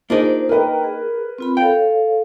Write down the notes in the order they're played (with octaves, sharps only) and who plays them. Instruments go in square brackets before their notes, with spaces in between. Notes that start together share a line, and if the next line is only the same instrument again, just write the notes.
[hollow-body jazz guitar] A#3 D4 D#4 [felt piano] F4 G#4 [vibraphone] C5
[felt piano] A#4 B4 [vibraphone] D#5 G5 A#5
[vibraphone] G#4
C4 F4 B5
[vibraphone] A4 C#5 F5 [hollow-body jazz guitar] G5